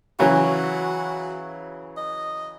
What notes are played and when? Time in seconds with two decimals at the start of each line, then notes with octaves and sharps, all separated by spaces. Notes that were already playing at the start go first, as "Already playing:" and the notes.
0.19 C#3 E3 F#3 F#4
1.97 D#5